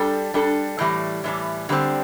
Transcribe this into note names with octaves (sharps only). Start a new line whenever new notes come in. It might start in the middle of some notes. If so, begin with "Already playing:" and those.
Already playing: G3 D4 A4
G3 D4 A4
A2 E3 G3
A2 E3 G3
D3 G3 C4